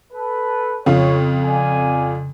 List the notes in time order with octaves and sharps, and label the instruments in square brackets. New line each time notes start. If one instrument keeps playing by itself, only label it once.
[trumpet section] A4 B4
[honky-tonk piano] F2 F4 [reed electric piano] C#3 [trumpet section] C#5
[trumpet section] D5 F5 G#5